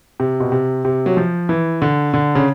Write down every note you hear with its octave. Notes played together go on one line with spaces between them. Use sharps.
C3
B2
C3
C3
F#3
F3
E3
D3
D3
C#3